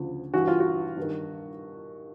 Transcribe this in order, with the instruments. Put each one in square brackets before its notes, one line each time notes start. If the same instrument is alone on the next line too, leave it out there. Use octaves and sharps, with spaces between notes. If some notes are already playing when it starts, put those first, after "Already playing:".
Already playing: [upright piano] D2 C#3 F3
G2 E3 F#4
F4
F#4
G2 D#3